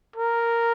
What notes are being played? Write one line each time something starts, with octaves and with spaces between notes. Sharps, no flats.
A#4